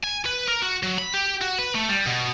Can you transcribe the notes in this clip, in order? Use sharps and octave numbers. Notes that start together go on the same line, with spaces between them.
G#5
B4
A#4
F#4
F#3
B5
G4
F#4
B4
A3
G3
B2